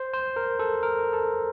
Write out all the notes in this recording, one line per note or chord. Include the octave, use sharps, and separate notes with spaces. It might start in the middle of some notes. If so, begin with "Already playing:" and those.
Already playing: C5
C5
A#4
A4
A#4
A4